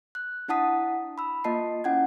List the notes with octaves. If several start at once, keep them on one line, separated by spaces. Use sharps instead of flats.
F#6
D4 E4 F#5 A5 D#6 B6
B5 E6
A#3 F4 D#5 A5 C7
C#4 E4 F#5 G5 G#6